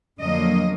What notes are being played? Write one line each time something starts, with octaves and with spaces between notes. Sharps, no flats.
F2 D3 F#3 A#3 D#5